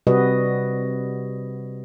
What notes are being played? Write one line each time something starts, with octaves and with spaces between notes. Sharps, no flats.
C3 G3 F#4 B4 D#5